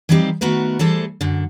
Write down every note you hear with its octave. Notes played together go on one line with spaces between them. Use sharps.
E3 F3 G3 C4 D#4 G4
D#3 A3 B3 F#4 A#4 B4
E3 G3 A3 G#4 A4 C5
F#2 D3